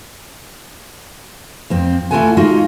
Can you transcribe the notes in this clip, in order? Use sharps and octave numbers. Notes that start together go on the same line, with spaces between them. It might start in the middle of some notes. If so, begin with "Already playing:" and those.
F2 C4
A3 E4 F4 A4 F#5 G#5
G#3 D#4 F4 F#4